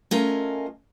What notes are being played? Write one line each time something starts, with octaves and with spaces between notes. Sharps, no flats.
A3 C#4 F4 A#4 D#5 G#5